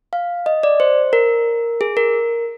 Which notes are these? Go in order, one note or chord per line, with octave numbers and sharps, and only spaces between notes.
F5
D#5
D5
C5
A#4
G#4
A#4